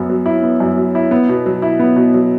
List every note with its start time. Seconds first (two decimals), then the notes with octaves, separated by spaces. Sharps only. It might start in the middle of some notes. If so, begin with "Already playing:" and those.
Already playing: F#2 B3
0.10 F#3
0.26 E4
0.43 B3
0.60 F#2
0.77 F#3
0.95 E4
1.11 B3
1.29 B2
1.46 F#3
1.62 E4
1.80 B3
1.96 B2
2.14 F#3